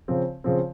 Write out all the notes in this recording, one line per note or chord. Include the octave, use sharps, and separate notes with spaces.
C#3 F3 C4
C#3 F3 C4